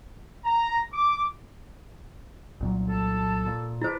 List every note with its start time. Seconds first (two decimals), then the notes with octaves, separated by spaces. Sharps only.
0.45 A#5
0.92 D6
2.60 C2 A#2 F#3
2.89 A4 A5
3.46 A#2
3.81 D4 E4 B4 C5